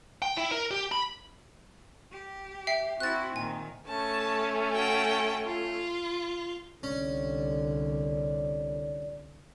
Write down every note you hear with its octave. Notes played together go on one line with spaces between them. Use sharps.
G5
E4
A#4
G4
B5
G4
E5 G5 C7
C4 E4 F#4 F#6 A6
A#2 D#3 G#5
A3 C#4 A5
F#4 G5
F4
C2 D3 C#4 D5